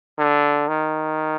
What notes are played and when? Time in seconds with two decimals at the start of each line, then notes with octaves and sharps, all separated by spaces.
0.19 D3
0.68 D#3